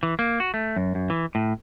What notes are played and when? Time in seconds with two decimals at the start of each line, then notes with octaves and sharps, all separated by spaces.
0.03 E3
0.19 A#3
0.40 F#4
0.54 A3
0.76 F#2
0.95 F#2
1.10 E3
1.35 A2